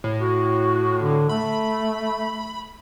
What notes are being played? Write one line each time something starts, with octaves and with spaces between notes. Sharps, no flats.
A2
F#4
D3
A3 B5